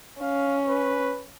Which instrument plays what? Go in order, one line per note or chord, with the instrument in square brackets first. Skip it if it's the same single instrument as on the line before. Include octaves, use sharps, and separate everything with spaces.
[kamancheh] C#4 [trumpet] F5
[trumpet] B4